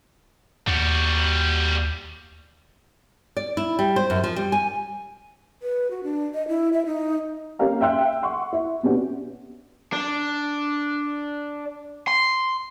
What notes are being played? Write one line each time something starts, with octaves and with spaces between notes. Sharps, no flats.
D#2 G3 F#4
D5
E4
G3
C5
F#2
F3
G3
G#5
B4
F#4
D4
D#5
E4
E5
D#4
A#3 C#4 G4 F5 A#5
E5 F5 G5 C6 E6 F#6
F#5 C6 C#6
E4
B2 B3 C#4 D4 F#4 G4
D4
C6